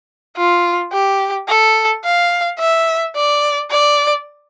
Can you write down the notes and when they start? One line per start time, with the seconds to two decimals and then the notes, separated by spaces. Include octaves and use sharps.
0.37 F4
0.93 G4
1.48 A4
2.05 F5
2.59 E5
3.16 D5
3.71 D5